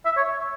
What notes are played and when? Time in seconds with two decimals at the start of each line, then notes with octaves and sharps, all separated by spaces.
0.05 E5
0.17 C#5